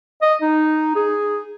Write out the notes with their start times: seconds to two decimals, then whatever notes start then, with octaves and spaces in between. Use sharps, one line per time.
0.22 D#5
0.42 D#4
0.96 G#4